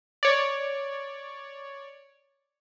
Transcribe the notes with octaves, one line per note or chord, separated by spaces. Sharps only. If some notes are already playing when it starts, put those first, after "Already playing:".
C#5 D5